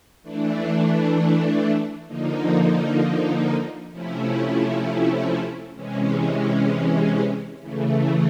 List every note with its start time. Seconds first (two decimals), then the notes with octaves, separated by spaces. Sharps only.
0.23 E3 A3 D4
2.07 D3 F3 A#3 D#4
3.91 C3 F3 A3 C#4 E4
5.75 C3 E3 G#3 C#4
7.59 C#3 E3 A3